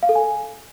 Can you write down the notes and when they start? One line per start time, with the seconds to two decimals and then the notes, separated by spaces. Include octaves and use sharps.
0.03 F5
0.09 A4
0.15 G#5